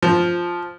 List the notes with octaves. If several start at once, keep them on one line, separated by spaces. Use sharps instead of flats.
F3